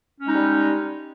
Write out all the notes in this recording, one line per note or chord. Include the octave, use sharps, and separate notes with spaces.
G3 G#3 C#4 D#4